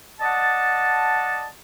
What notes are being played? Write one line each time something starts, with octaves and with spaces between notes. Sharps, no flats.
D5 D#5 F#5 A5